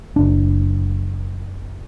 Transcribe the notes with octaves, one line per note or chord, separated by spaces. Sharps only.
F#1 D4